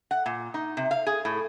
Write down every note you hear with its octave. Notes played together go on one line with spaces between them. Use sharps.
F#5
A#2
D#4
C3
F5
G#4
A2